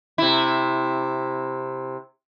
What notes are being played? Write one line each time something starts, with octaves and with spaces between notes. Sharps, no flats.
C3 E4